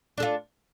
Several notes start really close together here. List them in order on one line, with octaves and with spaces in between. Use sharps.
D4 A4 F4